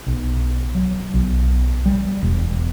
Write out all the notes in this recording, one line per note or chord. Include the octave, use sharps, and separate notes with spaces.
B1
F#3
B1
G3
E1